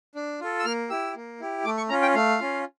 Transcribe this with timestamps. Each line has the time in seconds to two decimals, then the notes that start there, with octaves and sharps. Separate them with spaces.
0.15 D4
0.41 F4 A4
0.59 E6
0.65 A#3 F6
0.90 E4 G4 E6
1.16 A#3
1.40 E4 G4
1.65 A3 D6
1.77 C#6
1.89 C#4 F4 A#5
2.02 G5
2.14 A3 F5
2.40 C#4 F4